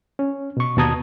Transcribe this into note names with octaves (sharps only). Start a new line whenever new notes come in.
C#4
B2 C#6
D#2 B2 A5 A#5 D#6 G#6